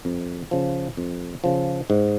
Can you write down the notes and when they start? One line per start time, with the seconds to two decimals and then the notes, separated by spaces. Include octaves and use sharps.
0.05 F2
0.51 C#3 F3
0.97 F2
1.44 C#3 F3
1.90 G#2